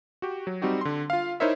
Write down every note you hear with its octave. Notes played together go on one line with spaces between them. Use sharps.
F#4 G4
F#3
G3 C4 D#4 F#4 G4
D3 C6
F4 F5
D#4 E4 A#4 C5 C#5 E5